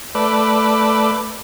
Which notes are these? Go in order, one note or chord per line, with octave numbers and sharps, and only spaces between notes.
A3 B4 D5